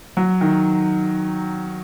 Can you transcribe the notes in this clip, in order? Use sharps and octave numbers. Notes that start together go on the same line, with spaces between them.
F#3
D#3